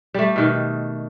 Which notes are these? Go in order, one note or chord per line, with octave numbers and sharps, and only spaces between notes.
G3 A3
B2 D#3